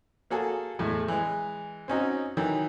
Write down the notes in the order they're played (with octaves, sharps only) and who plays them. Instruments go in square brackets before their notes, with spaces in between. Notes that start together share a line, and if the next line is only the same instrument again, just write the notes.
[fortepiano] A#3 F#4 G#4 A4
E2 A2 G#3
E3 G#3
C4 C#4 D#4 F#4
D#3 E3 F#3 E4